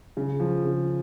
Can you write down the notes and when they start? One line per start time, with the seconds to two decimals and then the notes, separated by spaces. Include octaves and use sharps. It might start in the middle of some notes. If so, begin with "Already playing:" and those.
0.17 C#3
0.40 F3
0.64 C#3